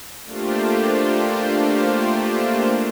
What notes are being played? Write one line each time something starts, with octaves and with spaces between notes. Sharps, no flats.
A3 A#3 D4 F4 G4 C5